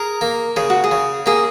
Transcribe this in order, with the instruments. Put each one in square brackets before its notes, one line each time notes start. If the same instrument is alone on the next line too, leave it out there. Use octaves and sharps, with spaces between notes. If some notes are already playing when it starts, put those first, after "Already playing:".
Already playing: [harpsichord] G#4 [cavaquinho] A#4
[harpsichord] A#3
[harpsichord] C#3 [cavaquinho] G#4
[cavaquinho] F#4
G#4
[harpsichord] C#3
[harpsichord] A#3 [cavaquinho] G#4